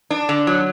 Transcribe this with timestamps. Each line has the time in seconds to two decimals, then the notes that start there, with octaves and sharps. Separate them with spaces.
0.10 D4
0.29 D3
0.47 F#3